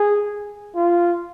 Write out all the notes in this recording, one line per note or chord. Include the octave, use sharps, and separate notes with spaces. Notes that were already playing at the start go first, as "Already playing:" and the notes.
Already playing: G#4
F4